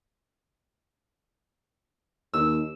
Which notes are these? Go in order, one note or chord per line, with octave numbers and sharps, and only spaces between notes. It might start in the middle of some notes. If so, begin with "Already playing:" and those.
D#2 E6